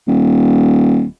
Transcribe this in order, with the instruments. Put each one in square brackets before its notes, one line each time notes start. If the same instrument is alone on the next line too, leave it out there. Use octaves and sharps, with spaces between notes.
[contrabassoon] D#1